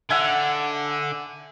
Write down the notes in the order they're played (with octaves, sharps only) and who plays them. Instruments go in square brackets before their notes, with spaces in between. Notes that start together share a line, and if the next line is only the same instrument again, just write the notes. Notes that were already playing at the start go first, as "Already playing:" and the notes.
[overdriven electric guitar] D3 [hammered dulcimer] E5 F#5 G#5